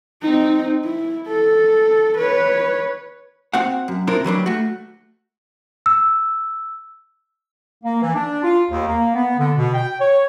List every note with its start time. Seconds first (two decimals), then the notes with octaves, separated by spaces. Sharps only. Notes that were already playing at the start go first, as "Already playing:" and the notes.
0.22 C4 D#4
0.84 E4
1.27 A4
2.18 B4 C#5
3.53 C4 F#4 F5 F#5
3.88 F#2
4.07 C4 D4 E4 F4 A#4
4.24 E3 F#3 G3 D4
4.46 A3 F#4
5.86 E6
7.84 A#3
8.02 E3
8.14 D4
8.44 F4
8.70 D#2
8.87 A#3
9.15 B3
9.38 D3
9.56 B2
9.74 G5
10.00 C#5